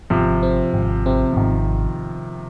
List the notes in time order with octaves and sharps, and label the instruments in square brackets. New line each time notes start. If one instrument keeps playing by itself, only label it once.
[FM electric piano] G#1 [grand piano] C3 F3
[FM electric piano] C4
G#1
[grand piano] C3 [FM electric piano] C4
[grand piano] F3
[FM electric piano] G#1 [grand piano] D#3